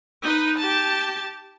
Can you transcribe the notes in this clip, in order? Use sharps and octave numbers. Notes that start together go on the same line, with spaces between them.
D#4 B4
G4 A5